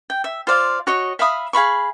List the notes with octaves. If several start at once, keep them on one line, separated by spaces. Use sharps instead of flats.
G5
E5
F4 C5 D5 F5
F#4 C#5 D#5
E5 F5 B5 D#6
G#4 F5 B5 C#6